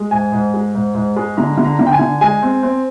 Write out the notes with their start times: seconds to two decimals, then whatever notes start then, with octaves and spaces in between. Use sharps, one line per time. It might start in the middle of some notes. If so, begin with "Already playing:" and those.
Already playing: G#3
0.11 G#2 G#5
0.32 G#2
0.54 G#3
0.75 G#2
0.95 G#2
1.16 G#3
1.37 D3 A#5
1.57 D3
1.65 A#5
1.79 D3
1.86 G5
1.93 G#5
1.99 D3
2.21 G#3 G#5
2.42 C4
2.63 C4